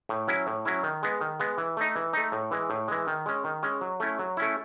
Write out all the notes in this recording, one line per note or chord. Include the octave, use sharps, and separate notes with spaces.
A2
F#3 C#4 E4
A2
F#3 C#4 E4
D#3
G#3 B3
D#3
G#3 B3
E3
A3 D#4
E3
A3 D#4
A2
E3 G#3
A2
E3 G#3
D#3
G#3 C#4
D#3
G#3 C#4
F#3
A3 C#4 E4
F#3
A3 C#4 E4